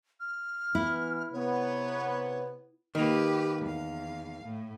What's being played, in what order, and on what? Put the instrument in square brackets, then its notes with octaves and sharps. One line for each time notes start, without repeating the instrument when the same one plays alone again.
[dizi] F6
[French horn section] E3 B3 [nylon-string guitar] E4
[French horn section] C3 B3 [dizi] C#5
[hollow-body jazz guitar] D#3 A#3 [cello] G4 B4
[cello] E2 F5
A2